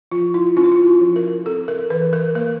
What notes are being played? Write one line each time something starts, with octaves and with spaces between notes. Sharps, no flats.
F3 F4
E4
C#4 F4
E4
F4
F#4
F3
A#4
C4 A4
A#4
E3 B4
A#4
A#3 A#4